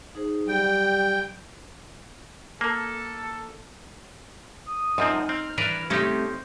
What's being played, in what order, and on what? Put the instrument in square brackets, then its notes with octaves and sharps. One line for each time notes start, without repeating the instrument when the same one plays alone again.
[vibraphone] D#4 G#4 C5
[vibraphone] F#3 [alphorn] G3 [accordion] G5
[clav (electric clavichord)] A#3 [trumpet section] A4
[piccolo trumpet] D#6
[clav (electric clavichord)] F#2 F3 C4 [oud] D#4
[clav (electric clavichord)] C4 [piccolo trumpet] F6
[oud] E3 [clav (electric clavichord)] D4 A#4 B4
[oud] C3 A3 [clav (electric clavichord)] C#4 D#4 G4 [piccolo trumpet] C5